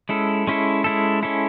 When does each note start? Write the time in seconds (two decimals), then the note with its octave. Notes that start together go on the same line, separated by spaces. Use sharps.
0.09 G#3 C#4 E4 A4
0.47 G#3 C#4 E4 A4
0.84 G#3 C#4 E4 A4
1.23 G#3 C#4 E4 A4